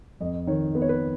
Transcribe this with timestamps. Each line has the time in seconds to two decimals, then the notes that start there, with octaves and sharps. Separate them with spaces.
0.21 F2 D#5
0.47 D#3 C#5
0.75 B3 B4
0.82 C#5
0.89 B4